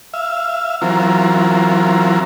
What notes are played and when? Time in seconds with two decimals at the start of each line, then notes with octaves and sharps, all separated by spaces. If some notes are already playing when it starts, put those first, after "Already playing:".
0.14 E5 F5
0.82 E3 F#3 C4 F4 A#4